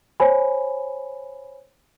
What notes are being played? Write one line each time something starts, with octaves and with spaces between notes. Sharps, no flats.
C5 C#5 G#5 B5